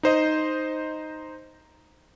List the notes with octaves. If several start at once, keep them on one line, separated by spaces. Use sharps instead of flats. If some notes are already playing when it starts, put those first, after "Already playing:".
D#4 C5 D#5